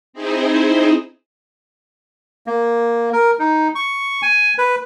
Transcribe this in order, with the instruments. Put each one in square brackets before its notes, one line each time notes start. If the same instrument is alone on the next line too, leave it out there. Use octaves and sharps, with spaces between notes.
[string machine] C4 D#4 E4 G#4 C5
[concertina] A#3
A#4
D#4
C#6
G#5
B4